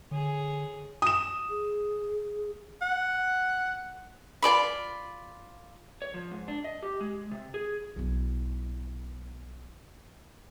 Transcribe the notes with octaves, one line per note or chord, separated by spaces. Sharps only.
D3 G#4 C#5
D#6 E7
G#4
F#5
F4 A4 D5 B5
C#5
F3
G#2
D4
D#5
G4
G#3
C3
G#4
B1 E4